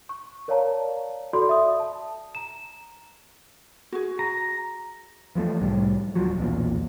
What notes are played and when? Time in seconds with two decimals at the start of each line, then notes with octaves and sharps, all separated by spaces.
0.09 C#6
0.48 A#4 C#5 D5 F5 A5 A#5
1.33 F#4 A4 D5 B5 C6
1.49 E5 D#6
1.80 A5
2.35 A#5 E7
3.92 F#4 G#4
4.19 A#5
5.35 E3 F3 G#3 A3
5.61 C2 A2 G3
6.15 D#1 D#2 F3 F#3
6.37 B1 E2 A#2